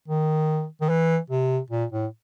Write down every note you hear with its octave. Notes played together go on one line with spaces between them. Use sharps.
D#3
D#3
E3
C3
A#2
A2